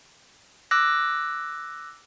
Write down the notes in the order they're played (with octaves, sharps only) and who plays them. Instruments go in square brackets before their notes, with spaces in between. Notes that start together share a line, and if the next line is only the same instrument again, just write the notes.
[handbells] D6 E6 F#6 A#6